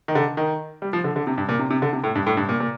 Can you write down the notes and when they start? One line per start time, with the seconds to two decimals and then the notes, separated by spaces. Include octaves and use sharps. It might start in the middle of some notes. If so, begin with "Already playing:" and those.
0.08 D#3
0.15 D3
0.37 D#3
0.82 G3
0.93 F3
1.04 D3
1.16 D3
1.27 C3
1.38 G2
1.49 A#2
1.59 C3
1.71 C3
1.82 D3
1.93 C3
2.04 A2
2.15 G2
2.27 A2
2.37 G2
2.49 A#2
2.60 A#2